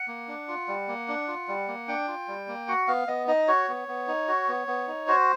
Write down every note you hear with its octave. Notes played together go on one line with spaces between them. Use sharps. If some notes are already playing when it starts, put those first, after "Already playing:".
Already playing: F#5
A#3
D4
F4
G3
A#3
D4
F4
G3
A#3
D4 G5
F4
G3
A#3
F#4 F#5
B3 F5
B3 D#5
D#4 D#5
F#4 C#5
B3
B3
D#4
F#4
B3
B3
D#4
F#4 C5